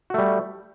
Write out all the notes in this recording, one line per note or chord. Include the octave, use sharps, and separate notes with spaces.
G3 A3 F#4